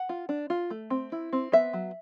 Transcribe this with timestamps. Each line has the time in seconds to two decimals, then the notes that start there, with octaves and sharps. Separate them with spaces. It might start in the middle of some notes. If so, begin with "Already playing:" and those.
Already playing: F#5
0.09 F4
0.29 D4
0.50 F4
0.70 A3
0.90 C4
1.12 E4
1.33 C4
1.52 B3 E5
1.73 F#3